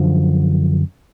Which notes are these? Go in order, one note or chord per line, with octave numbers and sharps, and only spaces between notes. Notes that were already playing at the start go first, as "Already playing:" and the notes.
Already playing: F#2 D3 F3